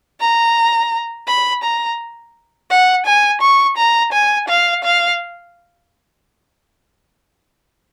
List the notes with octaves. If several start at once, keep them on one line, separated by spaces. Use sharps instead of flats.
A#5
B5
A#5
F#5
G#5
C#6
A#5
G#5
F5
F5